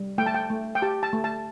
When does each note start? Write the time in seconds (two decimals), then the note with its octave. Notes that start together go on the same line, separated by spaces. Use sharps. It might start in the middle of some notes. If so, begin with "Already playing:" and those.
Already playing: G3
0.18 A3 G5
0.26 A5
0.34 G5
0.50 A3
0.75 G5
0.82 G4 A5
1.03 A5
1.13 A3
1.24 A5